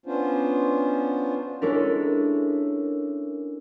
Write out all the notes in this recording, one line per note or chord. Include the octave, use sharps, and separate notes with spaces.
B3 C#4 D4 F4 C5
G#3 C#4 D4 E4 A4 A#4